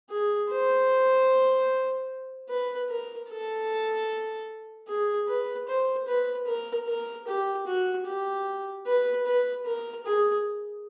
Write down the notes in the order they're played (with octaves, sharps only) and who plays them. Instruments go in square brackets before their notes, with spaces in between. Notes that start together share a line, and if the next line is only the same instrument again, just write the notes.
[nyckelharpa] G#4
C5
B4
A#4
A4
G#4
B4
C5
B4
A#4
A#4
G4
F#4
G4
B4
B4
A#4
G#4